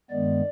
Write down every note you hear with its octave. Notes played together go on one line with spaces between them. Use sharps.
G2 D#3 G#3 B3 D5